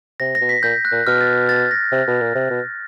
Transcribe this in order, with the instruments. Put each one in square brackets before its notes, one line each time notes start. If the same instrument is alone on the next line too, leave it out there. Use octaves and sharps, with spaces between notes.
[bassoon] C3 [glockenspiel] A#6
[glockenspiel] A#6
[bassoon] B2
[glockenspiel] B6
[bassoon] A#2 [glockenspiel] G6
[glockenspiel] F#6
[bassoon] A#2
[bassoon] B2 [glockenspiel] F6
[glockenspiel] A6
A6
A#6
[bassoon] C3
B2
A#2
C3
B2